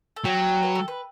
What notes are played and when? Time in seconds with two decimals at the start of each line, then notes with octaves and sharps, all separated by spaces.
0.16 A4
0.25 F#3 G4
0.63 B4
0.75 A4
0.88 B4